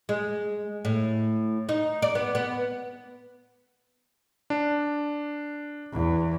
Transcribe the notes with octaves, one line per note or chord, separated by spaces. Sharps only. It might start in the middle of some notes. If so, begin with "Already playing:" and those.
G#3
A2
D#4
D5
B3
B3
D4
E2